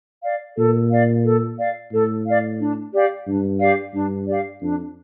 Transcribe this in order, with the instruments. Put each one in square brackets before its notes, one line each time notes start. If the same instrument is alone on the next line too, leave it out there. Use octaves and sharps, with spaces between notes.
[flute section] D5 F5
[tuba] A#2 [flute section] A4
[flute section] D5 F5
A4
D5 F5
[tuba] A2 [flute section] A4
[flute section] D5 F5
D4
G4 D5 F5
[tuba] G2 [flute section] D4
[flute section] G4 D5 F5
[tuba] G2 [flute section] D4
[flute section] G4 D5 F5
[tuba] F2 [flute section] D4